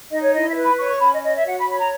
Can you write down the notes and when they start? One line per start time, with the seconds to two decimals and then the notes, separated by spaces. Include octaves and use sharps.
0.11 D#4 D#5
0.22 C#5
0.33 E4 D#5
0.49 E5
0.56 B4
0.63 B5
0.78 C#5 C#6
0.89 C#6
1.00 C#4 B5
1.12 D#5
1.23 C#5 D#5
1.35 E5
1.45 F#4 F#5
1.57 B5
1.67 C#5 B5
1.79 A#5